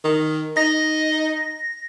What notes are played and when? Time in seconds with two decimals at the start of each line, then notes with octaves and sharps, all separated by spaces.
0.04 D#3
0.57 D#4 D#5 A#6